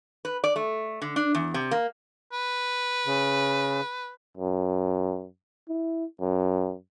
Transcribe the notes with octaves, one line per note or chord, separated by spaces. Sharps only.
B4
D5
A3
D3
D4
E2
C3
A#3
B4
C#3
F#2
E4
F#2